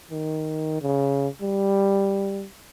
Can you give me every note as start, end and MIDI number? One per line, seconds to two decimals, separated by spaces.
0.11 0.79 51
0.82 1.28 49
1.42 2.46 55